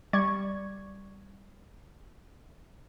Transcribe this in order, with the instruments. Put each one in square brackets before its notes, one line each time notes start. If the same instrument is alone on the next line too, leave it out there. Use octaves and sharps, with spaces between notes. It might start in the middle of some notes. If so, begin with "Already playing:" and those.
[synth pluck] G3 D5 C#6 G#6